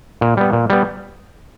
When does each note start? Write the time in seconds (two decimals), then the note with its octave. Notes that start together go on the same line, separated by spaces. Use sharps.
0.21 A#2
0.37 G3 B3
0.53 A#2
0.70 G3 B3